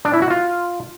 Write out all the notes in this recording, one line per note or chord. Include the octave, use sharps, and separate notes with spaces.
D4
E4
F#4
F4